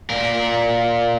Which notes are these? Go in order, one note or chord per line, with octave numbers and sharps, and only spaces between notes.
A#2 A#4